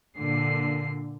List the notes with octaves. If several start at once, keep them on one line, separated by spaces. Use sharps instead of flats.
A#2 D3 C7